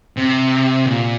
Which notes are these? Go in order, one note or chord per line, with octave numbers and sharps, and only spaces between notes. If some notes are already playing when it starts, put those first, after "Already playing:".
C3
A#2